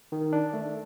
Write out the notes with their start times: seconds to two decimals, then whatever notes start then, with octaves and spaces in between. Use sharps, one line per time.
0.12 D#3
0.33 D4
0.54 A3